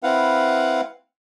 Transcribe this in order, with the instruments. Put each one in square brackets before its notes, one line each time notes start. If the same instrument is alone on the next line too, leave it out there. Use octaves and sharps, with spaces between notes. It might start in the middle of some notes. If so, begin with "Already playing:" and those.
[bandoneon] C4 E4 B4 F5 F#5